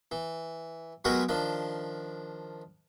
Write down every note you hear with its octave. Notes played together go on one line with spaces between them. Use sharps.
E3
F#3 G#3 B3 F#4 G4 A#4
D#3 F3 D4